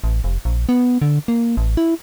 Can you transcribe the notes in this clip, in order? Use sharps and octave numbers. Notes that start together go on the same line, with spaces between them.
A1
F1
A#1
B3
D3
A#3
A1
E4